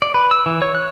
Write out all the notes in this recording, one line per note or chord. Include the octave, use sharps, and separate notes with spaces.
D5
B4
E6
E3
C#5
F#6